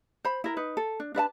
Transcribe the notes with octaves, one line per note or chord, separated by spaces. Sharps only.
C5 B5
E4 A#4
D#4 B4
A4
D4
D4 B4 E5 A5